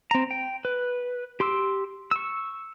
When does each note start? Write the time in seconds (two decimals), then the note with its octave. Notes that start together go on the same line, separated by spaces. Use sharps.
0.11 C4 A#5
0.31 G5
0.65 B4
1.40 G4 C6 D6 E6
2.11 C#6 E6